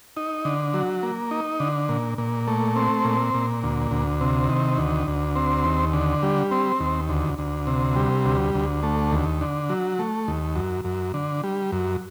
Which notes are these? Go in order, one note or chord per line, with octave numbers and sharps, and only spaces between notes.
D#4
D3
F#3
A#3
D#4
D3
A#2
A#2
A3
C4
A#2
A#2
D2
D2
C3
D#3
D2
D2
C4
D#2
D3
G3
C4
D#2
D2
D2
C3
G3
D2
D2
A3
D#2
D3
F#3
A3
D#2
F#2
F#2
D3
G3
F#2